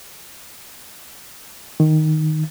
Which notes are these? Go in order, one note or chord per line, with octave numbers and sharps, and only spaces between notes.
D#3